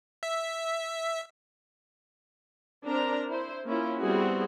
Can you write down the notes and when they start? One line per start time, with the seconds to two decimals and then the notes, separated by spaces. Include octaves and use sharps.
0.23 E5
2.85 C4 D4 A#4 C5 A#5
3.27 E4 C5
3.66 A#3 C#4 E4 F4
4.00 G3 B3 C4 E4 F#4 G#4